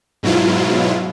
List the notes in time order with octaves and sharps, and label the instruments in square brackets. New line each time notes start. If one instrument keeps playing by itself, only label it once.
[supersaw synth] G#2 B2 F#3 E4 F4